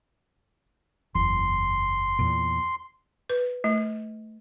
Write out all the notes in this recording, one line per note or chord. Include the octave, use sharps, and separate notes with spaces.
F#1 E2 C6
E2 A#2
B4
A3